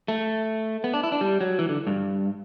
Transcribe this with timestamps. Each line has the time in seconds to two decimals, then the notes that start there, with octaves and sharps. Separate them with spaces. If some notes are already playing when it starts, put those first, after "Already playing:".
0.08 A3
0.84 B3
0.94 D4
1.03 E4
1.12 D4
1.21 G3
1.41 F#3
1.59 E3
1.69 D3
1.87 G2